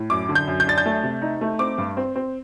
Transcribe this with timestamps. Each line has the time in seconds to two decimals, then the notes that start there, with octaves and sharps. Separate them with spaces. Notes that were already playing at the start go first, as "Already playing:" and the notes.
Already playing: A2
0.10 F#2 D6
0.29 D3
0.35 G6
0.47 F#2
0.60 G6
0.67 D4 A6
0.78 G6
0.86 A3
1.03 C3
1.22 D#4
1.41 A3
1.59 C4 D6
1.78 G2
1.97 C4
2.16 C4